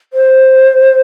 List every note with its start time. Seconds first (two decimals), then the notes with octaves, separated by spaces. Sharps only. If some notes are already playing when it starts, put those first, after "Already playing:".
0.13 C5